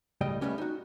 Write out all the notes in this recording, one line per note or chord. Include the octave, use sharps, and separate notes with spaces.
C#2 A2 G3 D#5 G5
G3 A3 B3 C#4 G4
D#4 F#4